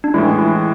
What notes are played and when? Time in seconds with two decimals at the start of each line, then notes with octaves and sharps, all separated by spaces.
0.04 D4
0.14 A2 E3 G#3 E4
0.39 E4